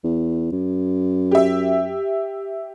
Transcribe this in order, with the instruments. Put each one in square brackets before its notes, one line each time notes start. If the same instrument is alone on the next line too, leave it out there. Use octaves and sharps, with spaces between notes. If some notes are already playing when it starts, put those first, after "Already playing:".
[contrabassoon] E2
F#2
[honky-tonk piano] G4 E5